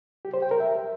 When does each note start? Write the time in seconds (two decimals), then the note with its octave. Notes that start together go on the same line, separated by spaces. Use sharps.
0.25 G4
0.34 C5
0.42 G5
0.51 A#4
0.60 E5